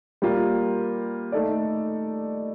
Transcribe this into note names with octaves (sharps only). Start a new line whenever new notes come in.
G3 A#3 F4 A#4
A3 D#4 A4 D5